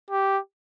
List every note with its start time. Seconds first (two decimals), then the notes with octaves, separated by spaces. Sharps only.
0.11 G4